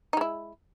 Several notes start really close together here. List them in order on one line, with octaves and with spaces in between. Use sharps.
D#4 G#3 E4